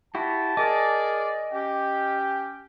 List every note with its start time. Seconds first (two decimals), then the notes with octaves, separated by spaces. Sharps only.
0.15 E4 F#4 G4 A5
0.57 G#4 A#4 D5 D#5 G#5 D6
1.52 C#4 G4 G5